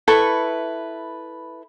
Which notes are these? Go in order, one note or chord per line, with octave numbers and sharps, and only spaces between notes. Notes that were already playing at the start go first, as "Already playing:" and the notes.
E4 A4 B4 C#6